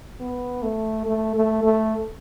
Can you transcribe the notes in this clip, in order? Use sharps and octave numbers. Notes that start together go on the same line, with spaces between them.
B3
A3
A3
A3
A3